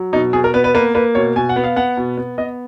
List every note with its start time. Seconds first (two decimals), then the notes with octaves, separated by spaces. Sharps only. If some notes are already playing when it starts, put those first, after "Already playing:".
Already playing: F#3
0.13 B2 D#4
0.33 B2 G#4
0.44 A#4
0.54 B3 B4
0.64 B4
0.75 A#3 B4
0.95 A#3 B4
1.15 B2 C#5
1.36 B2 G#5
1.49 F#5
1.56 B3
1.64 F5
1.76 B3 F#5
1.97 B2
2.17 B3
2.38 B3 D#5